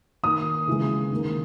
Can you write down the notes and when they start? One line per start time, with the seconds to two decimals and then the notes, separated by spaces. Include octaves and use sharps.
0.23 D#3 A#3 D#6
0.67 C#3 E3 G#3
1.11 D#3 A#3